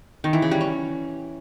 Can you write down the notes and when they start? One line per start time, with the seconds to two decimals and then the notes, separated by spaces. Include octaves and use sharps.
0.24 D#3
0.33 E3
0.42 C#3
0.51 G3
0.61 C#4